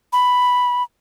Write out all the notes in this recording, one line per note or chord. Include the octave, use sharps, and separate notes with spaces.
B5